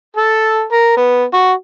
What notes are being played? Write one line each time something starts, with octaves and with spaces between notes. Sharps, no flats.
A4
A#4
B3
F#4